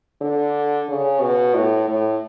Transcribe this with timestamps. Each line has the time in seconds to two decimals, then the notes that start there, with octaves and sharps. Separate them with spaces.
0.21 D3
0.89 C#3
1.22 B2
1.55 A2
1.88 A2